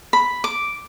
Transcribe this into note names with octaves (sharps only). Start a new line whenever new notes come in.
B5
D6